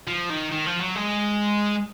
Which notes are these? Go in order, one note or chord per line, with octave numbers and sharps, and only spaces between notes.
F3
D#3
D#3
F3
F#3
G#3